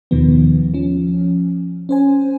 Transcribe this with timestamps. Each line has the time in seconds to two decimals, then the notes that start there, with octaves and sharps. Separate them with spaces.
0.11 D#2 B2 D#3 F3 B3
0.74 F3 C#4
1.89 C#4 C5 G#5